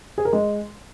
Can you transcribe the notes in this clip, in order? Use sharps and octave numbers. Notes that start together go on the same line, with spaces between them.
G#4
A#4
G#3